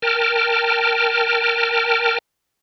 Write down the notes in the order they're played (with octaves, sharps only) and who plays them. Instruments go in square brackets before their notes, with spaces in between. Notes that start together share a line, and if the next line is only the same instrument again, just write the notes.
[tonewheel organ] A#4 G5 A5 F6